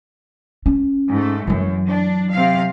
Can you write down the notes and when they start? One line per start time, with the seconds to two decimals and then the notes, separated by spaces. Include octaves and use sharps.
0.66 C#4
1.10 G#2 A3
1.47 F#2 E3 F#3
1.87 D4
2.32 C3 F5